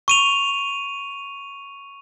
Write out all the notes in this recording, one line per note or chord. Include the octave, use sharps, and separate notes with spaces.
C#6 D#7 F7